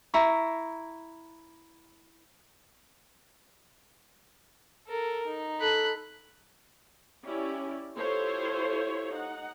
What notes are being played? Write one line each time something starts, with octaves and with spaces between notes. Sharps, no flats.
E4 A#5 C#6
A4 A#4
D#4
A4 B5 F#6
C#4 E4 G4 D5
E4 F4 G4 A4 C5 C#5
D#4 F#5